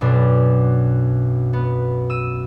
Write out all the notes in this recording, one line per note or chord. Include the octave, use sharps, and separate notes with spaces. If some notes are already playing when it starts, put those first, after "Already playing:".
B1 F#2 B2 D4
B3
E6 D#7